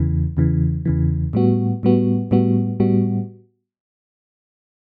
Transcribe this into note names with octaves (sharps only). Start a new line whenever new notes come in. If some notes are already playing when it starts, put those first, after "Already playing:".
Already playing: E2 C#3 E3
E2 C#3 E3
E2 C#3 E3
A2 G3 B3 F#4
A2 G3 B3 F#4
A2 G3 B3 F#4
A2 G3 B3 F#4